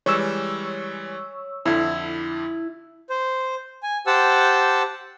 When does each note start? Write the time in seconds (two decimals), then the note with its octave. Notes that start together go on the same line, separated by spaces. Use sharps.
0.06 E3 G3 G#3 C#5 C#6 E6
1.65 F2 D3 E4
3.10 C5
3.83 G#5
4.07 G4 C5 F#5 A5 E6